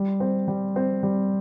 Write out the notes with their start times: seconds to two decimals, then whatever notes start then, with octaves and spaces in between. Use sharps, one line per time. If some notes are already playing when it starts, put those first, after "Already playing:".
Already playing: G3
0.20 C4
0.48 G3
0.76 C4
1.03 G3